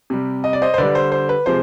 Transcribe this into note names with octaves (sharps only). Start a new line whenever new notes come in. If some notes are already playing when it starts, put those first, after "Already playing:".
C3 G3
D#5
D5
C5 D#5
C5
D3 G3 B4 D5
C5
C5
B4
C3 F3 G#3 C5